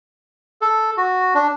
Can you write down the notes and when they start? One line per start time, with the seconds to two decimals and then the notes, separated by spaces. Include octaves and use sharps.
0.61 A4
0.97 F#4
1.35 D4